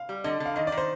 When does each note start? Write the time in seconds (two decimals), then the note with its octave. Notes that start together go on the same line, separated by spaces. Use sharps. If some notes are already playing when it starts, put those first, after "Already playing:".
Already playing: F5
0.09 G3
0.24 D3 D#5
0.40 D3
0.46 F5
0.56 D#3 D#5
0.67 D5
0.72 D#3
0.77 C5